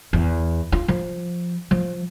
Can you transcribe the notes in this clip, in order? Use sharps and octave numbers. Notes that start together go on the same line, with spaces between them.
E2
F4
F3
F3